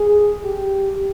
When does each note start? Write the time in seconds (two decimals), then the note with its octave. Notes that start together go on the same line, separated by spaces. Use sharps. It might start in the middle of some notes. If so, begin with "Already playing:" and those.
Already playing: G#4
0.44 G4